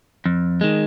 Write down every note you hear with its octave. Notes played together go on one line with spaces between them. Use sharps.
F2
D#3 G#3